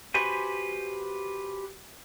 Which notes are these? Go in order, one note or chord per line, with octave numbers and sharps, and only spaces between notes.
F#4 G4 B4 C5 G#5